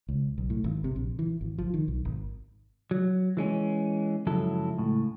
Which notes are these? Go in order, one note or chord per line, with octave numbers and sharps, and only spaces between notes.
C#2
B1
A2
G#1
C3
A#1
E3
G#1
F3
D#3
B1
G#1
F#3
E3 G#3 C#4
C#2 F#2 F3 F#3 E4 A4
C#2 A2